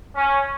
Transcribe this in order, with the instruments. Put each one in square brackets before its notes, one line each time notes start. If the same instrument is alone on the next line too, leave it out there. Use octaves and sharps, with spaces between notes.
[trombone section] C#4